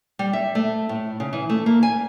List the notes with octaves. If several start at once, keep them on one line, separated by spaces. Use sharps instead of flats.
G3
E5
A3
A2
C#3
E3
A3
A#3
G#5